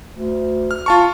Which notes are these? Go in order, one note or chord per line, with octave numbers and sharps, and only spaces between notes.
D2
F6
F4 A5 C#6